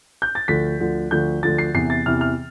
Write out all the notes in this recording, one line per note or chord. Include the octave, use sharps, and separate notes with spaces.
G6
A6
D2 D3 F3 B6
D2 D3 F3
D2 D3 F3 G6
D2 D3 F3 A6
C7
E2 C3 E3 C7
A6
E2 C3 E3 F6
F6